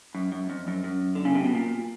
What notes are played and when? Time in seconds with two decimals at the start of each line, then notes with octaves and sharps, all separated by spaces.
0.15 F#2
0.32 F#2
0.50 F2
0.68 F#2
0.84 F#2
1.15 D3
1.25 C#3
1.35 C3
1.45 B2
1.55 A#2